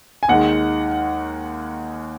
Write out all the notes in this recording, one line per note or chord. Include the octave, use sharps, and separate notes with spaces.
G#5
D#2 D#3 G#3 F#5